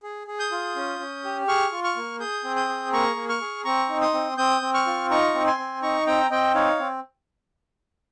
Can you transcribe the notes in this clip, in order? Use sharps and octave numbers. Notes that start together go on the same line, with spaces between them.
G#4
G#4
D#6 G6
F4
C#4
C#4
G4
G#4 C#6 F6
F4
C#6 F6
A#3
G#4 D#6 G6
C4
D#6 G6
G#4
A#3 A#5 C#6
A#3
C#6 F6
G#4
C4 A#5 C#6
D#4
C6 D#6
C4
C4 D#6 G6
C4
C#6 F6
F4
D#4 A#5 C#6
C4
G#5 C6
C4
D#4 A#5 C#6
C4 G5 A#5
C4 D#5 G5
D#4 C#5 F5
C4